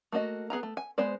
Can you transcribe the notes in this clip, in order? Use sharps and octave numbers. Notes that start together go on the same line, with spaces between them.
A3 A#3 F#4 D#5
B3 G#4 G#5 A#5
A3
G#5
G#3 B3 C5 D5